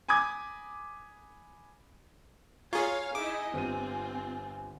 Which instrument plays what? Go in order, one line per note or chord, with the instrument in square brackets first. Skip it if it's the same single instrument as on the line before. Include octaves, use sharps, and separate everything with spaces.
[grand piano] G#5 B5 D6 D#6 G#6
[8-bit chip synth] F4 G#4 [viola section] C#5 F5 [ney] G#5 [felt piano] A#5 C#6 G#6
[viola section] D#4 E4 D#5 [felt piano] G#4 [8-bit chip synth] D6
[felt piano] G1 G4 D#7 [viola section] C4 F4